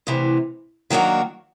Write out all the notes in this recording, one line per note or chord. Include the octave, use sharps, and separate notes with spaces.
D2 C3 E3
D#3 F#3 A#3 D4 F#4